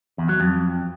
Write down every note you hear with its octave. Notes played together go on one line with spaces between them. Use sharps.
E2
F#3
F2